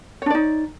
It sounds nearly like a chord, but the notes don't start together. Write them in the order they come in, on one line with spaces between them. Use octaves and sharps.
C#5 D4 D5 D#4